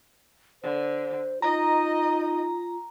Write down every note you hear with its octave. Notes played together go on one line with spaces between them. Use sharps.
D3 C5
D#4 F4 D#5 A#5